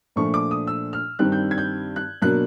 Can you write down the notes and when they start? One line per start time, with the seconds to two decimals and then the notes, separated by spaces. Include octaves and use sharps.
0.16 A#2 F3 A3 D4 C#6
0.34 D6
0.51 D#6
0.67 E6
0.93 F6
1.19 G2 D#3 G3 C4 F#6
1.32 G6
1.51 G#6
1.58 G6
1.96 F#6
2.22 B2 F#3 A#3 D4 F#6